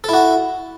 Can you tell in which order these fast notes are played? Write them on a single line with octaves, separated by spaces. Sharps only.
A4 E4 F#4